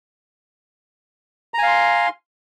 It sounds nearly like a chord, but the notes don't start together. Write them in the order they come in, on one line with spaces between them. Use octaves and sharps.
A#5 G#5 F5 C6